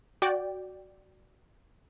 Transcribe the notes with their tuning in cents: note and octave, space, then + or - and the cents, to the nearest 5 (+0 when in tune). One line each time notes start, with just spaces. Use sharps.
F#4 +5 D5 +0 G5 +0